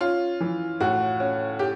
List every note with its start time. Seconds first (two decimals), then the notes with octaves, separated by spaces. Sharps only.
0.01 C#4 F4
0.41 E3
0.80 A2 F#4
1.20 C#4
1.59 G4